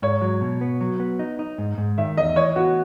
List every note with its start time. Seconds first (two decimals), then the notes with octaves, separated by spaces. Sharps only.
0.02 G#2 C#5
0.21 F#3
0.41 B2
0.61 B3
0.81 F#3
1.00 B3
1.19 D#4
1.39 D#4
1.58 G#2
1.78 G#2
1.98 D#3 E5
2.17 E2 D#5
2.36 E3 C#5
2.56 B3 F#4